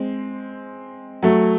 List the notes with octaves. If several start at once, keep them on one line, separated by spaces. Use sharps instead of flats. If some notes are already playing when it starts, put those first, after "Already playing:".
Already playing: G#3 C4
F#3 A3